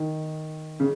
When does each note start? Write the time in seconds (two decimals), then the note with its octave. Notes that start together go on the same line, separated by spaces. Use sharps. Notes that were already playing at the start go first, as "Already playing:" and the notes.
Already playing: D#3
0.80 C#3